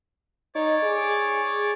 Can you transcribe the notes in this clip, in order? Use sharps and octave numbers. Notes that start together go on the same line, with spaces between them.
D#4 C#5 D5 D6
G#4